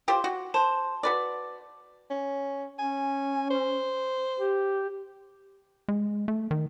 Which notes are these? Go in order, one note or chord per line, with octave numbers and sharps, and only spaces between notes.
F4 G4 C5
F#4
C5 A5
F#4 B4 D5
C#4
C#4 G#5
C5
G4
G#3
A3
D#3